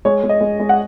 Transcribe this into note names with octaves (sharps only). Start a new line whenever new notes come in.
G#3 C#5
G#3
D#5
G#3
G#3
F#5